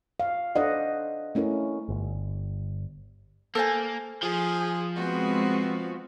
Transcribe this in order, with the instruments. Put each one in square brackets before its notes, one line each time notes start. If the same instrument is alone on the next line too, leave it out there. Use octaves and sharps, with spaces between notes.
[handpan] F5
D4 A4 C5 D5 D#5 F#5
A3 C#4 E4 A#4
[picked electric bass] G1
[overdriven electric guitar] A#3 [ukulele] A4 C5 G#5
[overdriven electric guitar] F3 [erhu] G#4
[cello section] G#3 B3 C4 [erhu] F#4